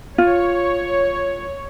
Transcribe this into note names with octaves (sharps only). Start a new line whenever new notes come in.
F4 C#5